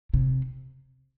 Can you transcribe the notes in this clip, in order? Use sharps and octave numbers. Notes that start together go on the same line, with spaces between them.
C3